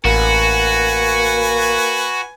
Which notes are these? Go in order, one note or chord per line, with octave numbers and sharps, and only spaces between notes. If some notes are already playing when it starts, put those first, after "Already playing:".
A1 A#3 F#4 B4 G#5